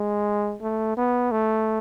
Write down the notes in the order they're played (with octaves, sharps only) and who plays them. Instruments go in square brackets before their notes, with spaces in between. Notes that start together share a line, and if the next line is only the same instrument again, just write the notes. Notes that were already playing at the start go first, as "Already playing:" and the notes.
Already playing: [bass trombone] G#3
A3
B3
A3